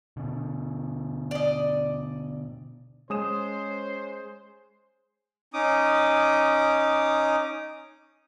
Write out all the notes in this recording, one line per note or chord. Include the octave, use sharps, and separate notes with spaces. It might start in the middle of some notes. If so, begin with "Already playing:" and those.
B2 D3
D5 D#5
G#3 C#4 C5 D#6 E7
C#4 D#4 D6 D#6